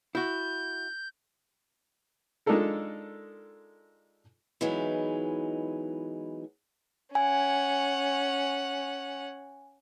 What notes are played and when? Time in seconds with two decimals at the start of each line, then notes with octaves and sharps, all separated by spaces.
0.15 E4 F#4 G6
2.46 G#3 D4 D#4 F4 A4 A#4
4.61 E3 F#3 G#3 B3 D#4
7.15 C#4 F#5 G#5